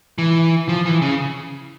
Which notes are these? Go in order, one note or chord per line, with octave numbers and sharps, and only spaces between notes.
E3
F3
E3
C#3